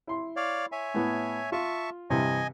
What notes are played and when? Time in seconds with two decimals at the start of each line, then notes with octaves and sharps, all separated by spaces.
0.07 E4 C6
0.36 C#5 D5 F5
0.72 C#5 E5 G#5
0.94 A2 B3
1.52 F4 E5 A5 C#6
2.10 G2 C3 E3 D#5 G#5